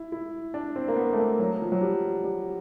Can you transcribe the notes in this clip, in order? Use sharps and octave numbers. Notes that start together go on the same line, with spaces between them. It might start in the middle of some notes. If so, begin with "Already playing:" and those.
Already playing: E4
E4
D4
C4
A#3
B3
A3
A#3
F#3
F3
F#3
G3
G3